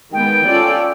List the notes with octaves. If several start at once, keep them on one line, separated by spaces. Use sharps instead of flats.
D#3 G#3 B3 G5
C#4 F4 A4 D5